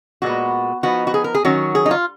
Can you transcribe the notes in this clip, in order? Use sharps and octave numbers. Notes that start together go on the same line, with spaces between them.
A#2 G#3 B3 F#4
F3 B3 D#4 F#4
F#4
G#4
A#4
G#4
D#3 F#3 C#4 F#4
G#4
D#4
F4